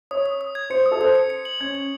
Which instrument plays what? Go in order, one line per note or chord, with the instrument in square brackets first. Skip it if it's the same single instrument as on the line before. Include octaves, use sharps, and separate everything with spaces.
[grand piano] C#5 [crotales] D#6
[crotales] D#6
D#6
G#6
[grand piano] C5 [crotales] C#7
[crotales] D#6
[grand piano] A4
[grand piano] C5 [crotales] D#6
[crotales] C#7
C#7
F#7
[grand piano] C#4 [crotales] G#6
[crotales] F#7